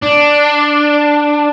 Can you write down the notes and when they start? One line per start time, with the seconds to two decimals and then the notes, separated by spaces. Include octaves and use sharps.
0.03 D4